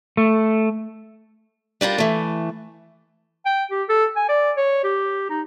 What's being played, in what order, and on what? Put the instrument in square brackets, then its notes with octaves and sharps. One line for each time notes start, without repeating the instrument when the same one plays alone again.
[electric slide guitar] A3
[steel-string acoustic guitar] G3 D4 F4 A#4
E3 A3
[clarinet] G5
G4
A4
G#5
D5
C#5
G4
D#4